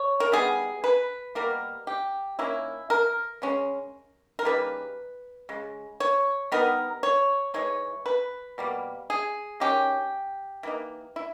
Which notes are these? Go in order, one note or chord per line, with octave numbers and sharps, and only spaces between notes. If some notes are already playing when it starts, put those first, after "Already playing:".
Already playing: C#5
A#4
G3 B3 D#4 G#4
B4
B2 G3 A#3 A#4
G4
D#3 A#3 C#4 E4
A#4
C#3 G#3 C#4
A#4
C#3 G3 A#3 D#4 B4
C#3 G#3
C#5
G3 B3 D#4 A#4
C#5
E3 G#3 D#4 C#5
B4
B2 G3 A#3
G#4
D#3 G#3 C#4 G4
E3 A#3 D#4
E4